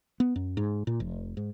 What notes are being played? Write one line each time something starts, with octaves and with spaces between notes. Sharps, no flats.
B3
F#2
G#2
A#2
F1
G#2